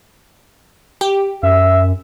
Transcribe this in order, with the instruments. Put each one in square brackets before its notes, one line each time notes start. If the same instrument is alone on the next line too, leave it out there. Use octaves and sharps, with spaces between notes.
[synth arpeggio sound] G4
[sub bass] F#2 [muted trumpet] E5